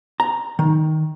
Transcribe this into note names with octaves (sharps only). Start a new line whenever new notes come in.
A#5
D#3